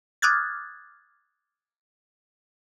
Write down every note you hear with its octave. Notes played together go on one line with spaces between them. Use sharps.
D6 D#6 F6 F#6 G#6 A6